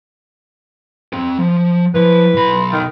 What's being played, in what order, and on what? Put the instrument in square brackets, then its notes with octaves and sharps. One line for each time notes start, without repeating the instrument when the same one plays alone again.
[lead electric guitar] C4 A4
F3
[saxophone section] E3 B4 [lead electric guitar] F3
[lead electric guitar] B1 B5
[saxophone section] D#3